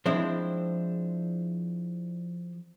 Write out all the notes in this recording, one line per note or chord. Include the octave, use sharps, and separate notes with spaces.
F3 G#3 C4 D4 E4 C5